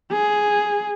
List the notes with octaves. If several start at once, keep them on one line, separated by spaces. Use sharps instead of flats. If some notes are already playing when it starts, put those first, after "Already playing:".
G#4